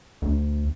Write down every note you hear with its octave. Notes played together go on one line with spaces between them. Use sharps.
D2